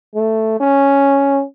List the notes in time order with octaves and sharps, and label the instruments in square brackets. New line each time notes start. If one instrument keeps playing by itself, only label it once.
[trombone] A3
C#4